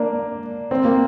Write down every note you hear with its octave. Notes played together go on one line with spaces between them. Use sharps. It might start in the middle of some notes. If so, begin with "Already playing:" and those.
Already playing: A#3 D4
C4
A#3